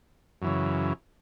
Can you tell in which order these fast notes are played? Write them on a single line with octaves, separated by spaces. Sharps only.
F#2 E3 C#3